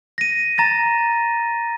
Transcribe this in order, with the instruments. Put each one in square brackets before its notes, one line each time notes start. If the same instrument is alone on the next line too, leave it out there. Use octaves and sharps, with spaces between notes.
[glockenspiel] A#6 D#7
A#5 A6 A#6